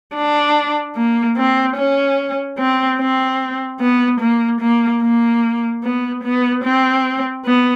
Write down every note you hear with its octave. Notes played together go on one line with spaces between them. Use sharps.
D4
A#3
C4
C#4
C4
C4
B3
A#3
A#3
A#3
B3
B3
C4
B3